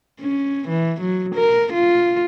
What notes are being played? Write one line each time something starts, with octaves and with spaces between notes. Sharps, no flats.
C#4
E3
F#3
A#4
F4